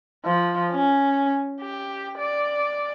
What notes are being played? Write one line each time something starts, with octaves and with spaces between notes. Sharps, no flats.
F3
C#4
G4
D5